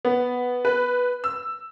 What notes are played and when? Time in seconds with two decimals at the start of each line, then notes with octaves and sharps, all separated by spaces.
0.05 B3
0.65 B4
1.24 E6